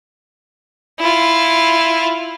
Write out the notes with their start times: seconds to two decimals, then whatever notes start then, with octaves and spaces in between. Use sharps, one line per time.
1.00 E4 F4